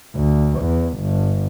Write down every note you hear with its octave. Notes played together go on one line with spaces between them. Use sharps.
D2
E2
G1